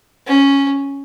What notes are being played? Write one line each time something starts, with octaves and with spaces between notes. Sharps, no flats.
C#4